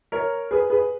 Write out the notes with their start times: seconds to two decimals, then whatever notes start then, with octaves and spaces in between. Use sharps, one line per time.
0.12 A#4 C#5
0.51 G#4 B4
0.70 G#4 B4